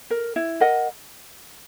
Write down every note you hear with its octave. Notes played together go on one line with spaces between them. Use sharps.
A#4
E4
A#4 D#5 F#5